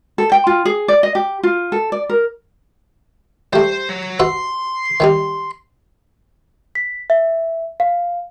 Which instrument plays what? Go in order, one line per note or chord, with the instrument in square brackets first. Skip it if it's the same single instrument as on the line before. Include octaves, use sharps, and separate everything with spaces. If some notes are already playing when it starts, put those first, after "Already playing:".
[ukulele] A4
G5
F4
G#4
D5
D#5
G4
F4
A4
D5
A#4
[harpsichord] G3 A3 [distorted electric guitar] C5
[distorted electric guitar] F#3
[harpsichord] F#4 B4 E5 [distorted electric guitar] C6
[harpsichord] D#3 G3 D#4
[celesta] B6
E5
F5